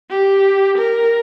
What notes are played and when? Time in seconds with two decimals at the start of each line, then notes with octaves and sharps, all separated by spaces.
0.10 G4
0.77 A#4